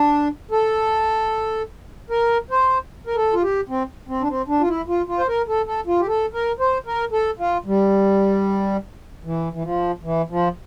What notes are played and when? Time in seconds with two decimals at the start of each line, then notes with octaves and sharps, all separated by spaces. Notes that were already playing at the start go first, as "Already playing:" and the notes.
Already playing: D4
0.51 A4
2.10 A#4
2.50 C5
3.07 A#4
3.16 A4
3.33 F4
3.42 G4
3.69 C4
4.08 C4
4.22 D4
4.28 C4
4.48 D4
4.61 F4
4.68 E4
4.88 F4
5.08 F4
5.18 C5
5.28 A#4
5.48 A4
5.67 A4
5.87 F4
6.00 G4
6.07 A4
6.34 A#4
6.59 C5
6.86 A#4
7.12 A4
7.39 F4
7.66 G3
9.25 E3
9.53 E3
9.64 F3
10.03 E3
10.30 F3